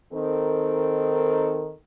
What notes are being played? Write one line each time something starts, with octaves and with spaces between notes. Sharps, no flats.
D#3 C4 D#4 A4 A#4